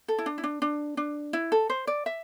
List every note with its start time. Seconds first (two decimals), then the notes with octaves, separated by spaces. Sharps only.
0.08 A4
0.18 E4
0.26 D4
0.38 E4
0.43 D4
0.62 D4
0.97 D4
1.33 E4
1.52 A4
1.70 C5
1.87 D5
2.06 E5